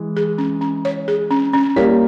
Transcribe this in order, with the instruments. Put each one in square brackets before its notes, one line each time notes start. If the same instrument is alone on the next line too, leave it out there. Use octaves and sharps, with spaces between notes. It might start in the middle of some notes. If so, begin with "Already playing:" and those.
Already playing: [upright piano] E3 G#3
[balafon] G#4
C#4
C#4
C#5
G#4
C#4
C#4
[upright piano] G3 A#3 [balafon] C#5